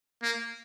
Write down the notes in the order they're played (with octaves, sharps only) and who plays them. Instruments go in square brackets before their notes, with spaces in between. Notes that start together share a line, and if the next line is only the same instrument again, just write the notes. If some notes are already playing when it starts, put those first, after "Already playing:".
[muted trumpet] A#3